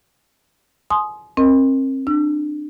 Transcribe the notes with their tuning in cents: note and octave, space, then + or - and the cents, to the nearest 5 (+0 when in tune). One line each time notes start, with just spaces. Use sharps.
G#5 +35 C6 +0 D#6 +0
C4 +35 A#4 +0 D#5 +0
D4 +25 E6 +40